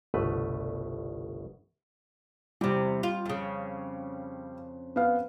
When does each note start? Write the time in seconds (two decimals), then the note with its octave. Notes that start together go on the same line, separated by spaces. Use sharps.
0.14 G1 C2 B2 A3 B4
2.61 E2 C3 G3
3.03 F4
3.26 F2 C#3
4.96 B3 F5